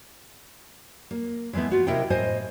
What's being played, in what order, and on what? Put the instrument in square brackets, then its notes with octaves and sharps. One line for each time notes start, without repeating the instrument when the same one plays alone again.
[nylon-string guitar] A#3
E3 G#3 A3 B3 E4
F4 F#4
C3 E4 A#4 D#5 G5
A2 C5 D#5 G#5